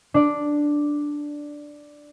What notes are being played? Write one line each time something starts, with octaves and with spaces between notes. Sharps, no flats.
D4 D5